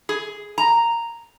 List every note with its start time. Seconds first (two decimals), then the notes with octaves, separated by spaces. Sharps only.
0.09 G#4
0.58 A#5